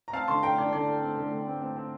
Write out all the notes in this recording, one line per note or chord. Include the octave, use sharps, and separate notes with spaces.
A#5
C4 F5 A5
D3 A5 C6
A3 G5 A#5
D3 D5
D3 D5
A3
C4
D3
D3
C4
C4
C4